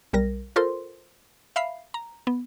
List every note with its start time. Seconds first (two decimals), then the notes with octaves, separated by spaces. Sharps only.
0.13 B1 G3 A#4 A#6
0.56 F4 A4 A#4 C5 C6
1.56 E5 F5 B5 C7
1.94 A#5
2.27 B3